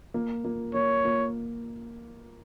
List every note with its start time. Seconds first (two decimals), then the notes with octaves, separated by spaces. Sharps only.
0.14 A#3
0.45 A#3
0.74 A#3 C#5
1.05 A#3